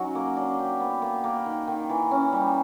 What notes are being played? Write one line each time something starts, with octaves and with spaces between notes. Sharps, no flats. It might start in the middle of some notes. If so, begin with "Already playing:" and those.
Already playing: F#3 C#4 D#4
A#3
D4
G4
B3
A#3
A#3
D#3
D#3
E3
C#4
G3